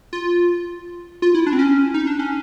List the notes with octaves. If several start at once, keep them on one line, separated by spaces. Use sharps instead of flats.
F4
F4
E4
D4
C4
C#4
D#4
D4
C#4